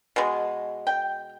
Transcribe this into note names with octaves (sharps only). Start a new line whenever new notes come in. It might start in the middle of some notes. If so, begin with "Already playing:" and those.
B2 G#3
G5